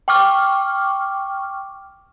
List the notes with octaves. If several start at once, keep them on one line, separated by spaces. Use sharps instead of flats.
G5 C#6 D6 F6